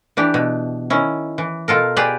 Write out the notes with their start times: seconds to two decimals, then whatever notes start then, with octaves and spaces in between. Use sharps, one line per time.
0.17 E3 D4 G4
0.34 B2
0.90 D#3 C#4 E4
1.38 E3
1.68 B2 F4 A4 A#4
1.96 G4 G#4 B4 D5 G5